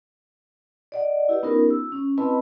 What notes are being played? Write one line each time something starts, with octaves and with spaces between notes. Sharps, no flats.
D5 D#5 F#5
E4 G4 B4
B3 C#4 D#4 F4 G4 A#4
E6
C#4
C4 E4 B4 D#5 A5 B5